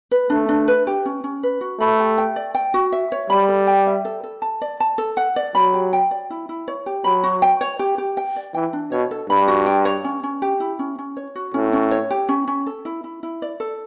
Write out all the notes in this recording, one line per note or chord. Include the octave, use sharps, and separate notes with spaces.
B4
A3 D4
D4
B4
G4
C#4
C#4
B4
F#4
A3 B5
G4
G5
D5
G5
F#4
E5
C#5
G3 B5
A4
G5
E5
A4
A4
A5
D5
A5
A4
F#5
D5
F#3 B5
G4
G5
D5
E4
E4
C#5
G4
F#3 B5
F#4
G5
C#5
G4
G4
G5
D5
E3 G5
D4
B2 C#5
A4
G2 B5
F#4
G5
C#5
C#4
C#4
G4
E4
C#4
C#4
C#5
F#4
A2 C#4
C#4
C#5
G4
C#4
C#4
A4
E4
E4
E4
D5
A4